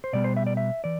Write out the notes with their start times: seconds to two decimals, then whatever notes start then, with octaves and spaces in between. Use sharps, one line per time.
0.04 C5
0.13 B2 G3 B3 D5
0.24 C5
0.37 E5
0.47 D5
0.57 E5
0.84 E3 D5